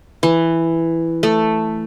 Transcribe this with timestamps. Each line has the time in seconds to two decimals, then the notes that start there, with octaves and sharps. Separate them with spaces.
0.23 E3
1.23 A3